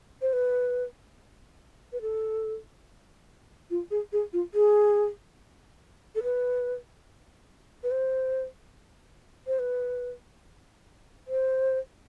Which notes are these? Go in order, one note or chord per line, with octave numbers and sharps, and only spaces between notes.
C5
B4
B4
A4
F4
G#4
G#4
F4
G#4
A4
B4
B4
C5
C5
B4
C5